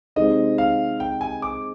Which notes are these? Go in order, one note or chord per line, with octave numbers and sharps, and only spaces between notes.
C3 D#3 G#3 C4 D#4 D#5
F5
G5
G#5
D6